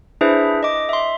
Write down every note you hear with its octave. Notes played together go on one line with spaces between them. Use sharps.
D4 E4 G#4 B4 C5 E5
D#5 D6
E5 C6